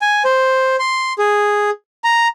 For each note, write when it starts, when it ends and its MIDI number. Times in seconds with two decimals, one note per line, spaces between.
0.02 0.23 80
0.25 0.76 72
0.79 1.13 84
1.18 1.70 68
2.04 2.28 82